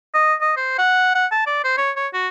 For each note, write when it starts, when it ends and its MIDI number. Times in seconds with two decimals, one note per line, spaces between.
0.14 0.34 75
0.41 0.52 75
0.57 0.78 72
0.79 1.15 78
1.15 1.26 78
1.32 1.46 81
1.47 1.61 74
1.64 1.77 72
1.77 1.91 73
1.96 2.07 73
2.14 2.29 66